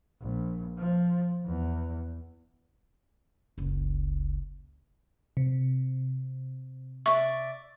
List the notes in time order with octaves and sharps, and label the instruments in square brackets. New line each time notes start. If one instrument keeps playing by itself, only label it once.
[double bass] A#1
F3
E2
[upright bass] F#1 C#2
[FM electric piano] C3
[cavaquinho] D5 E5 [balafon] C#6